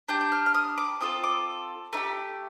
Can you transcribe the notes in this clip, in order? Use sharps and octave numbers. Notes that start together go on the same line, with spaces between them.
D4 G4 G6
G6
F6
F6
D#6
D6
C4 F4 A4 D#6
D6
A3 D#4 G4